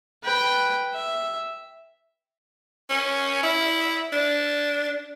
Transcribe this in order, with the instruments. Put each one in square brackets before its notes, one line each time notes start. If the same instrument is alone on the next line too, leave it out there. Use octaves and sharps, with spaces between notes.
[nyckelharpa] B4 G5
E5
[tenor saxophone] C#4
E4
D4